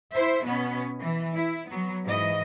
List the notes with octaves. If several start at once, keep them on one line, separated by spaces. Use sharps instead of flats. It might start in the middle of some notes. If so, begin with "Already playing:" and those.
E4 C5 E5
B2 B3 C#4
E3
E4
F#3 B3
G#2 E3 D#5